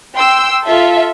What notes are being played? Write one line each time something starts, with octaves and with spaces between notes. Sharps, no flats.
G5 C6 E6
F4 A4 E5